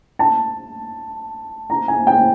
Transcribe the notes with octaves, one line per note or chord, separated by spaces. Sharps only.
A5
A#5
G#5
G5